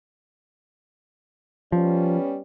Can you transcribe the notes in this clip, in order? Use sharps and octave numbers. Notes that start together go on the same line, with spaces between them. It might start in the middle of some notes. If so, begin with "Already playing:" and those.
F3 G3 B3 C#4